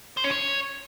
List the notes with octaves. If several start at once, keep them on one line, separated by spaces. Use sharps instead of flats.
C5
C#4
C#5